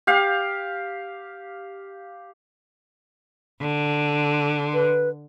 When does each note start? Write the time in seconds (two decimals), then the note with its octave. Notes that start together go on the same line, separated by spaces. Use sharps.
0.07 G4 F5
3.61 D3
4.74 B4